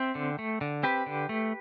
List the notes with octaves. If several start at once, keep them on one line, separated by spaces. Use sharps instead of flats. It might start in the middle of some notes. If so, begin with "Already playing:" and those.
Already playing: C4 E5 G5
D3
A3
D3
C4 G4 B4
D3
A3